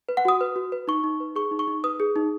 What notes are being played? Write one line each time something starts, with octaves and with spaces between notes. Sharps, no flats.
B4
F#5
F#4 D#6
B4
F#4
B4
D#4 C#6
D#4
B4
G#4 C#6
D#4
C#6
D#4
B4 D#6
G#4
D#4